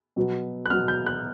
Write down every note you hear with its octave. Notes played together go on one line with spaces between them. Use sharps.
B2 F#3 B3
F#6
B2 F#3 B3 F6
G6
F#6